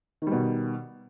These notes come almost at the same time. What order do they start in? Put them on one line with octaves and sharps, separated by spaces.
D#3 G3 B2